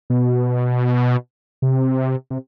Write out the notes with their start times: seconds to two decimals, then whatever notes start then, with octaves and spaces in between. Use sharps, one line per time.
0.10 B2
1.62 C3
2.30 C3